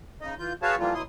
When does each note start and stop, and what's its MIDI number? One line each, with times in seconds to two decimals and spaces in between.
0.21 0.34 49
0.21 0.34 63
0.21 0.34 75
0.39 0.53 52
0.39 0.53 65
0.39 0.53 91
0.62 0.76 66
0.62 0.76 68
0.62 0.76 71
0.62 0.76 73
0.62 0.76 77
0.62 0.76 81
0.79 0.94 52
0.79 0.94 53
0.79 0.94 55
0.79 0.94 57
0.79 0.94 58
0.79 0.94 65
0.94 1.02 47
0.94 1.02 54
0.94 1.02 64
0.94 1.02 84
0.94 1.02 87